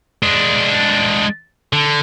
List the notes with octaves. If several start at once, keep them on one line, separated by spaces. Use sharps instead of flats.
G#3 D4
D3